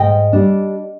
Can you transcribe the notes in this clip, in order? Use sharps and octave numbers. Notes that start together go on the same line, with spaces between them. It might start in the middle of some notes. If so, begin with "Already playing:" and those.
Already playing: G#2 D#5 G5
G3 D4